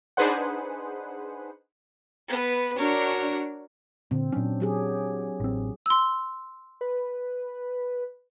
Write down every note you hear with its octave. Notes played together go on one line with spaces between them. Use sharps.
D4 D#4 G#4 B4 C5 F#5
B3 B4
D4 F#4 A#4 C#5
A#2 D3 C4
A#2 F#3 C#4 D4
F#3 G4 G#4
A1 C4
C6 E6
B4